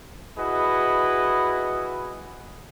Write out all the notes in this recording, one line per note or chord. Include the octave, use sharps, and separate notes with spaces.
E4 F#4 G#4 B4 D#5